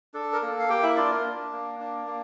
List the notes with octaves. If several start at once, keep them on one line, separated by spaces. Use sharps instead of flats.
D4 A4
A#4
A#3 A4
F5
A#3 G4 G5
E4 E5
D4 F4 D5
A#3 A#4
D4
A#3
D4
A#3